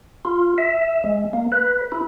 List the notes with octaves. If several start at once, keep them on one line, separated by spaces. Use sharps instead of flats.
F4
E5
G#3
A#3
B4
E4